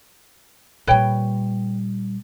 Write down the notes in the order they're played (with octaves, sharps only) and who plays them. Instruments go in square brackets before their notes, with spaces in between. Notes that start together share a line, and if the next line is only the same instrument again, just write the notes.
[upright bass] A#2 G3 [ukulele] B4 C#5 G5